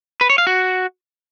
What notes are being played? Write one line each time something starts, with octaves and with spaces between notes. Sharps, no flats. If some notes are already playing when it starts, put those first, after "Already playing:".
B4
C#5
F5
F#4